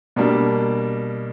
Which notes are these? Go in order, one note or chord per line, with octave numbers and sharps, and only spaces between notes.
B2 G3 A#3 D4